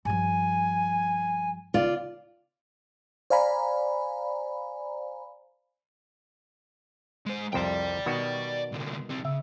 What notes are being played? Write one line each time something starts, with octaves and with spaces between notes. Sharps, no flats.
G2 F3 G#5
C#3 F4 D5
C5 D5 F5 G#5 A#5 B5
G#3 C5
C2 F2 C5 D5 G5
B2 D#3 F#4
C2 D3
G3 C4
C#3 E5